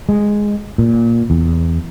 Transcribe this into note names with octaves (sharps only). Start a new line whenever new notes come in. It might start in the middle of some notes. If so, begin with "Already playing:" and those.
G#3
A#2
E2